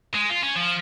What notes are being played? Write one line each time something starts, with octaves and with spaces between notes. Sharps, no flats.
G#3
F4
C#4
F3